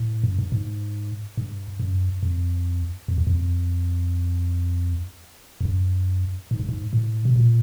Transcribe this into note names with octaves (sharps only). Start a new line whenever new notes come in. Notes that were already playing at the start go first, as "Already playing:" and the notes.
Already playing: A2
F#2
G2
G#2
G2
F#2
F2
F2
E2
F2
F2
F#2
G#2
G2
G#2
A2
B2
A#2